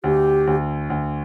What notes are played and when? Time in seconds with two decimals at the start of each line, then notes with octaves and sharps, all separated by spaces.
0.04 D2 G4
0.47 D2
0.90 D2